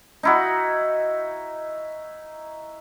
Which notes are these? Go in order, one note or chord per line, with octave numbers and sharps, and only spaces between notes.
D#4 E4 F#4